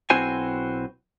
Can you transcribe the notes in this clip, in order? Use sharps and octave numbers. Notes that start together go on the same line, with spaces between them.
B1 C4 E4 F#4 C5 G#5